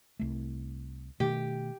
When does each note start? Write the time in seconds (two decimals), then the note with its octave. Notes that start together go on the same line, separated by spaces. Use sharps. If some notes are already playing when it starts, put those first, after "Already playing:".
0.19 C2 A3
1.20 B2 D#3 A3 G4